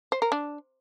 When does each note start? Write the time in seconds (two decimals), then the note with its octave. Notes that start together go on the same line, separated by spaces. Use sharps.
0.12 C5
0.22 A#4
0.32 D4